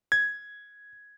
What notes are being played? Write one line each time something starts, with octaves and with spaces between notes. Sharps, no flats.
G#6